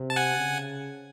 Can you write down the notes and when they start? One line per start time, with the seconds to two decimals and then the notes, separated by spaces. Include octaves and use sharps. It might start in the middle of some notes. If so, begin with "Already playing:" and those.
Already playing: C3
0.10 A5
0.16 F#5 G#5
0.37 C#3